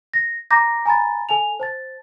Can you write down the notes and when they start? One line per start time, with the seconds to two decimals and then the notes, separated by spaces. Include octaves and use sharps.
0.14 A#6
0.51 A#5 D6 G6 A#6
0.86 G#5 A#5 B5 A6
1.29 A4 G#5 A5 F7
1.60 C5 A5 A6